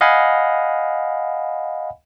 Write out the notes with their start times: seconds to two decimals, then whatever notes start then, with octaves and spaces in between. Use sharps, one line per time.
0.01 D#5 F5 F#5 G#5 B5